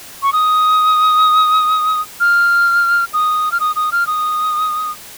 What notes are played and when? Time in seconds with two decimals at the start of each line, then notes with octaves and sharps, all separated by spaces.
0.23 C#6
0.33 D#6
2.20 F6
3.13 D#6
3.52 F6
3.60 D#6
3.76 D#6
3.92 F6
4.07 D#6